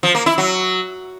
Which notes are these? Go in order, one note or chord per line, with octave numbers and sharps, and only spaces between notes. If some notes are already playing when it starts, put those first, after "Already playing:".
F3
A#3
E4
F#3